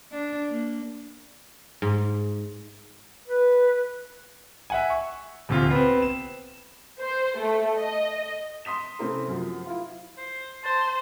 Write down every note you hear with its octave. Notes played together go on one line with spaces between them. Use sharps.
D4
A#3
G#2
B4
E5 F#5 G#5
C#6
D#1 D2 C3 F4
B3 C4
E7
C5
A3
D#5
C6 D#6 B6 E7
C3 A3 C4 C#4 E4 A#4
F#2 F3
E4 F4
C5
C5 A5